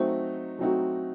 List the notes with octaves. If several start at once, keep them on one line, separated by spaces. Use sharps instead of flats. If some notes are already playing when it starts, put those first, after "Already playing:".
Already playing: F#3 A3 C4 D#4 F#4 C5
F#3 A3 C4 D#4 F#4